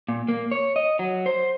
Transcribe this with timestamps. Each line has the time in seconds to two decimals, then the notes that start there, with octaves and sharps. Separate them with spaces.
0.09 A#2
0.28 A#3
0.51 C#5
0.76 D#5
0.99 F#3
1.26 C5